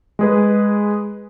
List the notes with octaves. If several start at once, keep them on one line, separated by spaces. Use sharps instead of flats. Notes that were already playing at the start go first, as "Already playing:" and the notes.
G#3 G#4 B4